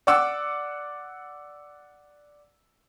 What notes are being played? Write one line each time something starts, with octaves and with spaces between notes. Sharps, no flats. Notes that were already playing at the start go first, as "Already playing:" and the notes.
D5 F#5 D6 E6